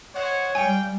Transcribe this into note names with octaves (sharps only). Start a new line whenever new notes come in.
C5 C#5 D#5 F#5
G3 D5 F5 G5 G#5